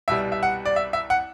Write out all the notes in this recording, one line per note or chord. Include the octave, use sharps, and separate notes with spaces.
C2 B2 G3 E5
E5
F#5
D5
E5
E5
F#5